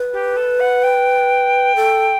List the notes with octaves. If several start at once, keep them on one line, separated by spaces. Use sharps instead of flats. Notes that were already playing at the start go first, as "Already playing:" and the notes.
Already playing: B4
G4
A4
F#5
G5
A4